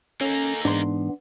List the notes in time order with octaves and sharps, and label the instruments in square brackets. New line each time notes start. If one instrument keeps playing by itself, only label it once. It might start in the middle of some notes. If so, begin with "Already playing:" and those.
[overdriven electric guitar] A#3 D#4 [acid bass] C#4 [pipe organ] A4 G#5
[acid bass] G#2 [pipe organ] E3 B3 [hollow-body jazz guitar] D4 C6